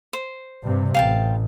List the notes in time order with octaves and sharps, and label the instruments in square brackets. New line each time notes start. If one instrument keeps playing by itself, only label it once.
[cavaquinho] C5
[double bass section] G2 C3
[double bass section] A1 [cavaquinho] F5 G5 A5